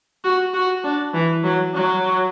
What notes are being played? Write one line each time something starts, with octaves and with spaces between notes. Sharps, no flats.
F#4
F#4
D4
E3
F#3
F#3